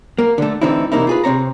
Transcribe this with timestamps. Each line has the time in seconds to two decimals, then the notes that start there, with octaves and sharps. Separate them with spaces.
0.19 A#3
0.38 D3 A3
0.61 A2 D3 E3 C4 D#4 E4
0.92 E2 C3 A#3 D#4 E4
1.07 F4 G#4 B4
1.24 C3 C4 C#5 A#5